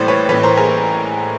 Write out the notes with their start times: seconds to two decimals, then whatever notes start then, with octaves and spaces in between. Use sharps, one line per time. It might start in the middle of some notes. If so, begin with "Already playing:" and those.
Already playing: A2 E3 G3 C5 D5
0.08 B4 C#5
0.29 A1 A2 E3 B4 C#5
0.43 A#4 C5
0.57 G#4 A#4